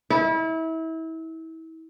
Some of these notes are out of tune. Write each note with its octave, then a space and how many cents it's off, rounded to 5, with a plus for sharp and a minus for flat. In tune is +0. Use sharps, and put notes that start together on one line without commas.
E4 -30